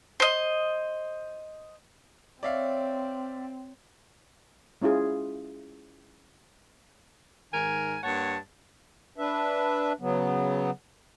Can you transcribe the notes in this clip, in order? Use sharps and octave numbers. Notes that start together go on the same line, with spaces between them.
C5 D#5
C4 C#5 D5 E5 F5
G#3 C#4 E4 F4 G#4
G#2 D#3 A#4 G#5
G2 A#3 C#5 F#5 A5
D4 B4 E5
C#3 F#3 B3